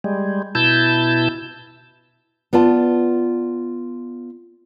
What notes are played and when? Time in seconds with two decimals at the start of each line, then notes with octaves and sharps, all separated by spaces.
0.04 G3 G#3
0.55 B2 E4 A5 G6
2.53 B3 F4 D5 A5